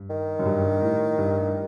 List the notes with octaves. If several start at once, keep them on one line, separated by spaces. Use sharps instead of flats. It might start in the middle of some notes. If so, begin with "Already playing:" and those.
Already playing: G2
D#3
F#2
G2
A2
G2